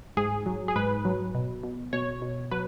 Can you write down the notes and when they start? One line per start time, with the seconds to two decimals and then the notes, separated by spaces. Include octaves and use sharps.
0.17 G#2 G#4
0.46 F#3
0.68 G#4
0.76 G#2 B4
1.05 F#3
1.35 B2
1.63 B2
1.93 B2 C#5
2.22 B2
2.51 F#3 B4